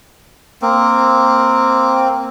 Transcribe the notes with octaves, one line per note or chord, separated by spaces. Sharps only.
A#3 C4